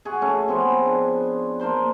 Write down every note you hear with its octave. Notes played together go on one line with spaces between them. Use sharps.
F#4 G#4
A3 C#4
F3 B3 C4 G#4
D4
A#3 D4 C5 C6